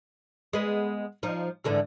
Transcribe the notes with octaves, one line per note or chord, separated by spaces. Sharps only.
G#3 B3
F3 D#4
G#2 D3 E3